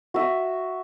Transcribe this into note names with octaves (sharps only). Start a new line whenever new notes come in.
F#4 E5